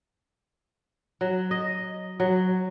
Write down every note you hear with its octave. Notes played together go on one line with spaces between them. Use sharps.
F#3
D#5
F#3